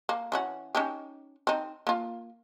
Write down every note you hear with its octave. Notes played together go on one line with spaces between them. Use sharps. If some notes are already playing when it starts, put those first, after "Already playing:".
A#3
E3 C#4 F#4
C#4 D#4 G4
C4 D#4
A#3 F4